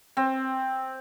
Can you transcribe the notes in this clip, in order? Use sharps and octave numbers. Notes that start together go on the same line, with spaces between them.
C4